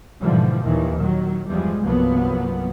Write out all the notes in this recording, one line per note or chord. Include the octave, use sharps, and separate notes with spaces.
G#2 B2 D3 E3 F3 G3
D#2 A#2 D#3 E3
A#2 D#3 F#3
E2 G2 F3 G3 G#3
C2 G2 F3 F#3 A#3 B3